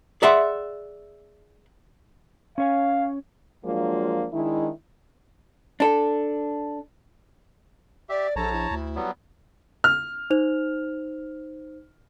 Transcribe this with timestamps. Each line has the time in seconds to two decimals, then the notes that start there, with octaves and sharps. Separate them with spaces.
0.22 G#4 D5 E5 F#5 C6
2.58 C#4 C#5 F5 G#5
3.65 F3 F#3 G#3 A#3 D4 F4
4.33 D#3 G#3 D4 E4
5.80 D4 A4
8.09 G4 D5 E5
8.36 A#1 A4 C#5 A5 A#5
8.52 E4
8.71 D2
8.96 F#3 G3 B3
9.84 F6
10.30 D#4 C5 F7